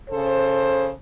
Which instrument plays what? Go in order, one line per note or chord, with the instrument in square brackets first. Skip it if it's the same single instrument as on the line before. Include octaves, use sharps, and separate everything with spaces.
[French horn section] C#3 A4 C5